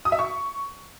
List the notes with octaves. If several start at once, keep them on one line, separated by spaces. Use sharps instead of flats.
D#6
E5
C#6